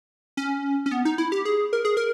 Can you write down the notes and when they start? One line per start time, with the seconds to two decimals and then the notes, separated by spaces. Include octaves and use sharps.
0.37 C#4
0.86 C#4
0.91 B3
1.05 D#4
1.18 E4
1.32 G4
1.45 G#4
1.73 A#4
1.85 G#4
1.97 A#4